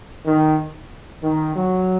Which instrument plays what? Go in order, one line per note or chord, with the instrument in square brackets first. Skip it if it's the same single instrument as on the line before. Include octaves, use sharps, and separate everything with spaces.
[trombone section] D#3
D#3
F#3